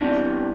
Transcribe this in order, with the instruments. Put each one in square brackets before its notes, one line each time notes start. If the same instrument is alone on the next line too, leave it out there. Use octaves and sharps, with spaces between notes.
[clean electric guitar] E2 C3 E3 G3 [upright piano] D4